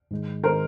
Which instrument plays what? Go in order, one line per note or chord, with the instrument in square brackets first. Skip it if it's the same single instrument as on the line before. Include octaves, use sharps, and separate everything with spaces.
[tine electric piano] G#2 D#3 G#3
[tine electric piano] D#3 G#3 [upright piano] A#4 C5